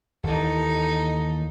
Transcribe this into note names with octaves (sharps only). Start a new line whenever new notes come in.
D#2 E3 D#4 A4